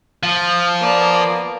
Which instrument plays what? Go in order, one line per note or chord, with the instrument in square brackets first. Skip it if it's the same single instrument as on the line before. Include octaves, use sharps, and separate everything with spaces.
[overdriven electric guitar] F3
[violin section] A#3 B3 D5